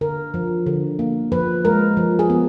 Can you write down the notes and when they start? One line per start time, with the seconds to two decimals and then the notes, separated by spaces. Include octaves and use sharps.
0.01 D3 A#4
0.34 F3
0.67 D3
0.99 A#3
1.32 F3 B4
1.65 G#3 A#4
1.97 F3
2.19 G#4
2.30 B3